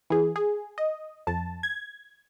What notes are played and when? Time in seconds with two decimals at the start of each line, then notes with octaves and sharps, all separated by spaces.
0.10 E3 G#4
0.36 G#4
0.78 D#5
1.27 F2 A5
1.63 G#6